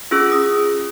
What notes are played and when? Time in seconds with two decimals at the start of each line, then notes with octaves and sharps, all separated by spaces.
0.11 C#4 F4 G#4 E6
0.32 D#6